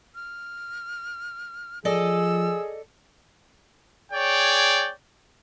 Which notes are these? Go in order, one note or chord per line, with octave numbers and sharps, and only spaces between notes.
F6
F3 G#4 A4 D5 D#5 E6
G#4 C#5 D5 G5